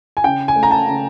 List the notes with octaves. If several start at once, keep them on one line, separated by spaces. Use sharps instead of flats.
G#5
C#3 G5
G#5
A3
A#5
A5
C#3